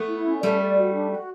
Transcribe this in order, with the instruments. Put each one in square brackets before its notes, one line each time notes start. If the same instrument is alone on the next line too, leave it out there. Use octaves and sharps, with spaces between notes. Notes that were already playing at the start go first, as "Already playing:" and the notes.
Already playing: [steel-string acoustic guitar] A3 B3
[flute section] E4
C#4
[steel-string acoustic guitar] G3 A3 [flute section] A4
[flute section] D5
F#4
D4
F#4